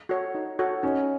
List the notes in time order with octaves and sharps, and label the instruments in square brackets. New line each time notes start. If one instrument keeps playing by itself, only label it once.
[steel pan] F#4 A4 C#5
D#4
F#4 A4 C#5
[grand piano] C#4 [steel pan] D#4